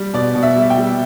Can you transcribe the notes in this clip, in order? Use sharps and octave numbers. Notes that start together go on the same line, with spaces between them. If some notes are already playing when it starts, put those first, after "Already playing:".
Already playing: G3
B2 D5
B2
E5
G3
G5
G3